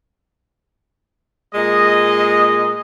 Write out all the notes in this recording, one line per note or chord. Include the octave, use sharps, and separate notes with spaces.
A#2 G#3 D#5